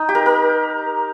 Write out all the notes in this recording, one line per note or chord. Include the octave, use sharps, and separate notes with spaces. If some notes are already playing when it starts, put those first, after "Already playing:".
Already playing: D#4
G4
A#4
A#4